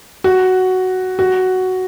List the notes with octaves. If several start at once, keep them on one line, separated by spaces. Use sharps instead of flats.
F#4
F#4